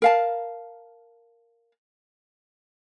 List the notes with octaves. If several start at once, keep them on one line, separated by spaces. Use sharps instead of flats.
A#4 F5 A5